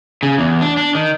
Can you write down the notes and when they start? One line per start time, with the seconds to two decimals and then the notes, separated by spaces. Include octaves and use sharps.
0.23 C#3
0.38 E2
0.61 D4
0.77 D4
0.95 D#3